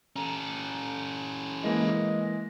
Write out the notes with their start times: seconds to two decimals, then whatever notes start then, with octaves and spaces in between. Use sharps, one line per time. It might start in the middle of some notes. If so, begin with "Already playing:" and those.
0.16 C#4 A4 A#5
1.64 E3 G#3 A#3 D#5